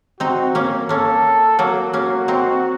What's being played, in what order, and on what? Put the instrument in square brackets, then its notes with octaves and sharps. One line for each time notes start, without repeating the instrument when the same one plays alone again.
[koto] C4 D#4 [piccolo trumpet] F#4
[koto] A#3 C#4
[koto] A#3 C#4 [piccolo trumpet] A4
[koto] F#3 A#3 [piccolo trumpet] F#4
[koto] A#3 C#4
C4 D#4